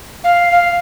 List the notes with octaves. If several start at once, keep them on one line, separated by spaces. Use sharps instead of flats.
F5
F5